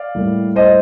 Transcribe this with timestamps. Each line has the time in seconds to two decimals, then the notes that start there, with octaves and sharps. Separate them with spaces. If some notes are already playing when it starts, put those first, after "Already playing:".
Already playing: D5 F5
0.15 A2 G3 A#3
0.56 C5 D#5